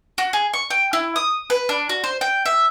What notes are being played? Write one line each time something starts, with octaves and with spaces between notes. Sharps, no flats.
F#4
G#4
C#6
G5
E4
D#6
B4
D4
F#4
C5
G5
E5